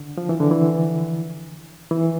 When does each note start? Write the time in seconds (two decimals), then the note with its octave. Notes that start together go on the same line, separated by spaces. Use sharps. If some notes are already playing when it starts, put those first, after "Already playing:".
Already playing: D3
0.18 F3
0.29 E3
0.40 D3
0.51 E3
1.91 E3